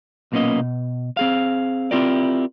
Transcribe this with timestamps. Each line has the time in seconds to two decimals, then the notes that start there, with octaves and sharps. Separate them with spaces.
0.32 B1 A#2 A#3 B3 C#4 D#5
0.60 B2
1.17 C4 G#4 F5
1.91 C4 E4 F4 G4 A#4 D5